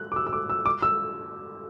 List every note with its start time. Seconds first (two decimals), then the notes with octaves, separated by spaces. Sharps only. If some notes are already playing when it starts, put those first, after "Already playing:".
Already playing: F#6
0.12 D6
0.16 E6
0.27 E6
0.33 D6
0.50 E6
0.66 D6
0.82 E6